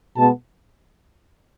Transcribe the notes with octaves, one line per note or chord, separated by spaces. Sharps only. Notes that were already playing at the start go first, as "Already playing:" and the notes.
B2 G#3 B3 A5